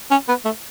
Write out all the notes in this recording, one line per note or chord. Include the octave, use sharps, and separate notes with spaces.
C#4
B3
A3